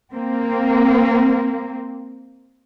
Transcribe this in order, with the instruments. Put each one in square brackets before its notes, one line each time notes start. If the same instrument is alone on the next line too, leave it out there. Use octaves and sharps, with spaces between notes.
[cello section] A#3 C4